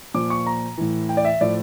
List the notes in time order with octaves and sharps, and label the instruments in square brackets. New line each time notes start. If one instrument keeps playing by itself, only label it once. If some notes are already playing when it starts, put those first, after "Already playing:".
[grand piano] A#2 F3 D6
C#6
A#5
A2 E3
G5
D5
E5
A2 F3 D5